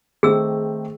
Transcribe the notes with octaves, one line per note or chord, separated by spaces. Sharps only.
D#3 A3 C4 G#4 E6